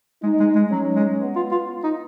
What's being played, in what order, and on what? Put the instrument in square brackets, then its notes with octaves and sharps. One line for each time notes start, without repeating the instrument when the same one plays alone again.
[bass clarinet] G#3 [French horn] D#4
[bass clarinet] G#3
G#3
[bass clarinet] F#3 [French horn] C#4
[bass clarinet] G#3
[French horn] B3
[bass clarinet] F4
F4
D#4